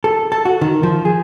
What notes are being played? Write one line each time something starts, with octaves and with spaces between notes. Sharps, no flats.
A4
A4
F#4
D#3
F3
G#4